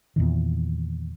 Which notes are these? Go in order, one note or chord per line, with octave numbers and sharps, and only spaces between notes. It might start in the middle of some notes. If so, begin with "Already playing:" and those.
E2 A#2 D#3